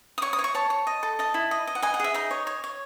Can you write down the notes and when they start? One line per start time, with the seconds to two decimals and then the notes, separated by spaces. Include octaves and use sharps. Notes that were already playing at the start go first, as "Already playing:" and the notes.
0.18 D#6
0.22 C#5 C#6
0.33 D#6
0.39 C#5
0.44 C#6
0.55 C#5 A5
0.70 C#5
0.87 D#5
1.03 A4
1.19 D#5 A5
1.34 E4
1.51 D#5
1.67 D#5
1.75 F#5
1.82 D#5 G#5
1.94 F#5
2.00 G#4 E5
2.14 D#4 D#5
2.31 C#5
2.47 C#5
2.64 C#5